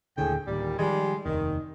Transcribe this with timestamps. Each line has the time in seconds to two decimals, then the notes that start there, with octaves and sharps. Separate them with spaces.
0.18 D#1 D#2 A2 D3 G#4 G5
0.47 D1 A#2 D#3 G3
0.79 D#3 F3 G3 G#3
1.25 F1 D#2 D#3